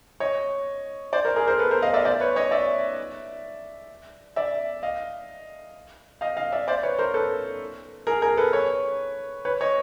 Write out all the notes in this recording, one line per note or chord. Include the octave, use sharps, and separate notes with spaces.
C#5 D#5
C5 D5
A#4 C5
G#4 A#4
A#4 C5
A4 B4
A#4 C5
D#5 F5
D5 E5
C5 D5
B4 C#5
C#5 D#5
D5 E5
D5 E5
D#5 F5
D#5 F5
D#5 F5
D5 E5
C5 D5
B4 C#5
A#4 C5
A4 B4
G#4 A#4
G#4 A#4
A4 B4
B4 C#5
B4 C#5
C#5 D#5